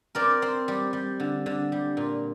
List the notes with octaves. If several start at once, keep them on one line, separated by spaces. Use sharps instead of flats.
C4 A#4 D5
C4
G3
G3
D3
D3
G3
A#2